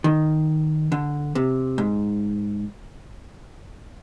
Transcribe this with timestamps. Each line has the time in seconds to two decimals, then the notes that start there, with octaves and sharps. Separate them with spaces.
0.04 D#3
0.92 D3
1.35 C3
1.78 G#2